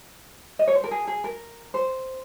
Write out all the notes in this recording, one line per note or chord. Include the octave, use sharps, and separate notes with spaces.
D#5
C#5
C5
A#4
G#4
G#4
A#4
C5